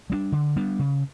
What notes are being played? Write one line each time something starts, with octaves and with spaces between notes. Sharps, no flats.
G3 B3 D4
D3
G3 B3 D4
C#3